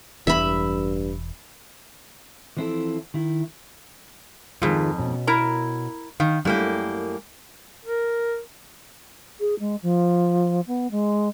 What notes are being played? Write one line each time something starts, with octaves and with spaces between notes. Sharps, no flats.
E1 G2 E3 E5 B5
E3 F3 C4 E4 A4
D#3 E4
F2 G#2 D#3 G#3 F4
B2 C#4
E4 A#4 A#5
D#3 F5
F#2 G3 A3 A#3 E4 G4
A#4
G#4
G#3
F3
B3
G#3